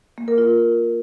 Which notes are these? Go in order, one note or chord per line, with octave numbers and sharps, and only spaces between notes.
A#3
A#4
F4